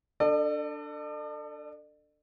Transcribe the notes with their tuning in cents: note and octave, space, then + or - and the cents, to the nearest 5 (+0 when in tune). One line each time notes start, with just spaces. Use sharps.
D4 +0 A4 +20 D5 +45